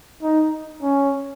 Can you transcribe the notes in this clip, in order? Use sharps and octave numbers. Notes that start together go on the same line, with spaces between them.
D#4
C#4